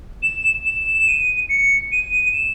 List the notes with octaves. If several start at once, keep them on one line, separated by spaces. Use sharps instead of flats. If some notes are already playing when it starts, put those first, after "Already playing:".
E7
E7
E7
D#7
C#7
D#7
D#7
E7